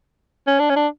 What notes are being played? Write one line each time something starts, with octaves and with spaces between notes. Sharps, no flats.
C#4
D4
C#4
D4